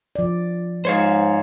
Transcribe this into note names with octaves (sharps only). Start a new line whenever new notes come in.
F3 D5
G#2 C5 C#5 F5